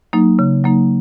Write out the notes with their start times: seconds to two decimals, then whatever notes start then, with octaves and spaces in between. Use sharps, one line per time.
0.13 F#3 A#3 D#4
0.39 C#3
0.64 F#3 A#3 D#4